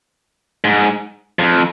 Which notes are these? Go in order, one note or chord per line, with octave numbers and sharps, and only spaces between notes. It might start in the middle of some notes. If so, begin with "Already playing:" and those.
G#2
F2